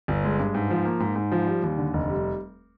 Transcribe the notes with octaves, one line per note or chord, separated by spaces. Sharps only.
G1
G#3
G2
G#2
F3
A#3
G#2
G#2
F3
G3
D#2
D3
F1
G3